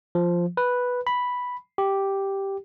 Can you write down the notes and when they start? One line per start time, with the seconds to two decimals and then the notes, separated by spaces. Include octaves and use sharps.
0.15 F3
0.57 B4
1.07 B5
1.78 G4